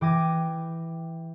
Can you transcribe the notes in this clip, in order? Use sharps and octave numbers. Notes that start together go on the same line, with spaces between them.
E3 G5 D6 G#6 A#6 D#7